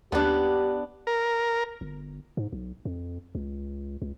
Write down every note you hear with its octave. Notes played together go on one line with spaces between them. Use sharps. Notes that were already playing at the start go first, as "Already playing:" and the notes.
D#2 B3 D4 G4
A#4
G1
G#2
B1
F2
C#2
C#2